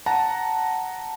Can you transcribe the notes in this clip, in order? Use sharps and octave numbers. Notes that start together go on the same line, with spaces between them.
F#5 A5 A#5